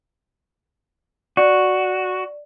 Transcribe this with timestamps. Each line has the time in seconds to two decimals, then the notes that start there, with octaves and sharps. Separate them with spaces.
1.37 F#4 D5